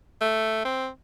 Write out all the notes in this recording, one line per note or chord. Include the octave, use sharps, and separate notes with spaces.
A3
C4